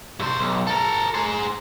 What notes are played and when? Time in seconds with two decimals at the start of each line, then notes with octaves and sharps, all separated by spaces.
0.20 G2 C5
0.39 B1
0.67 A4 A#4
1.14 G#4 C5